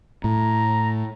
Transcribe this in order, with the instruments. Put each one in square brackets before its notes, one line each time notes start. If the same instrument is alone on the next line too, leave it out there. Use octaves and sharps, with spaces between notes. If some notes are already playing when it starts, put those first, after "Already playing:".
[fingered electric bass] A2 [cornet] A#5